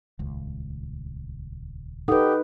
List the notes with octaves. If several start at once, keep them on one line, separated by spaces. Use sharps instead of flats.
D#1 C#2
D#4 G4 A4 B4 F#5 D#6